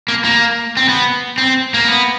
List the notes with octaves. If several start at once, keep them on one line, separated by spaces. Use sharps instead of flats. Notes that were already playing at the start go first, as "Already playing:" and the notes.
A#3
A#3
C4
B3
C4
A#3
B3